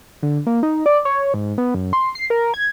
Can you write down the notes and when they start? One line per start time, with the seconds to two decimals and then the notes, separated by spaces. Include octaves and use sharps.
0.22 D3
0.46 A#3
0.63 D#4
0.86 D5
1.05 C#5
1.34 G#2
1.58 B3
1.74 F#2
1.93 C6
2.15 C7
2.30 A#4
2.54 G#6